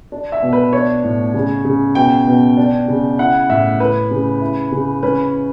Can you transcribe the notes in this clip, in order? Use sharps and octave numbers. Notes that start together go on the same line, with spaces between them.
D4
E5
B2
B4
D4 C#5
A2
C#3
C#3
B2 G5
B2
D4
C#3
E4 F#5
A2 E5
E4 B4
C#3
E4
C#3
C#4 B4